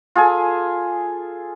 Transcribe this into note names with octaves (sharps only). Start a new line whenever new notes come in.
F4 G#4 A4 G#5